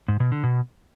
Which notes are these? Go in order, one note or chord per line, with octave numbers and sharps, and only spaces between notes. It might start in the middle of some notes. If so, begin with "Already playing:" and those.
G#2
B2
D3
B2